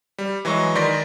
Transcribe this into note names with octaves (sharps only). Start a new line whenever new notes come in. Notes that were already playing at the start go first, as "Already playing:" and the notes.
G3
E3 F#3 G#3 C#6
D#3 D5 C6 A#6 B6